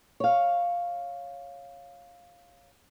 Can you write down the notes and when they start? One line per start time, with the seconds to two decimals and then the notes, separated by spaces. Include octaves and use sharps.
0.20 C#5 F5